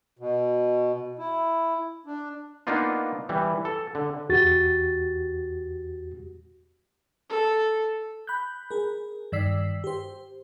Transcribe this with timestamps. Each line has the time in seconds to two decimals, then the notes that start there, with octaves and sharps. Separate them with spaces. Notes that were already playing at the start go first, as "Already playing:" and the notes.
0.19 B2
1.19 E4
2.06 D4
2.67 A#3 B3 D4 D#4 F4
3.29 E3 G3
3.65 A4
3.95 D3
4.29 E2 F#4 G4 A6
7.29 A4
8.27 B5 F#6 G6
8.71 G#4 A#4
9.32 G2 D#3 D5 E6 B6 C7
9.84 G4 C5